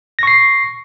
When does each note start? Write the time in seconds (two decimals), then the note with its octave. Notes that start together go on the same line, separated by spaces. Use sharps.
0.19 A#6
0.23 C#6
0.27 C7